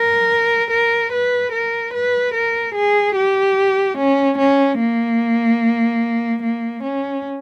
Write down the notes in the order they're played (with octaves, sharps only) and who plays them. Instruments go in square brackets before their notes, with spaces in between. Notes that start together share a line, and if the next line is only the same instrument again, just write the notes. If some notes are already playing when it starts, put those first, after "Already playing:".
Already playing: [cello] A#4
A#4
B4
A#4
B4
A#4
G#4
G4
C#4
C#4
A#3
A#3
C#4